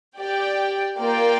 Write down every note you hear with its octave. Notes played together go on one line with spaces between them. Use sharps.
G4 D5 G5
A#3 F4 D5 G5